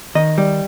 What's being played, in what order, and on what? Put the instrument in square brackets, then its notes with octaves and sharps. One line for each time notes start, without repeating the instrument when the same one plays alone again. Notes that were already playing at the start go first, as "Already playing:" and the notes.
[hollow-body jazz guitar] D#3 D#5
G3